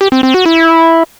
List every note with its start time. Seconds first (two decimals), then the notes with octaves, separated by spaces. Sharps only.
0.01 G4
0.12 C4
0.23 C4
0.34 F#4
0.46 E4